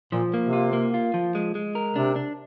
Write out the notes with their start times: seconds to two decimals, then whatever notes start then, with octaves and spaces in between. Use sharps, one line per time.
0.12 A#2 F3
0.34 A#3
0.43 C3
0.53 F4
0.73 A#3
0.94 F4
1.14 F3
1.35 G#3
1.55 G#3
1.75 A#4
1.95 C3 D4
2.16 D4